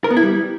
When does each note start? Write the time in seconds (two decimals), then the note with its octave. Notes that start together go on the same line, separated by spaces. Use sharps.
0.04 A#4
0.11 B3
0.17 E4
0.23 G3